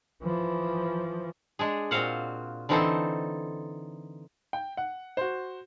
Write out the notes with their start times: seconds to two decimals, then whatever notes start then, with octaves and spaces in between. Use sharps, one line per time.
0.23 E3 F3
1.59 G#3 D4 G#4
1.91 A#2 C4 F#4 C5 F5 F#5
2.69 D3 E3 C4 D#4 A4 C5
4.53 G5
4.77 F#5
5.17 F#4 C5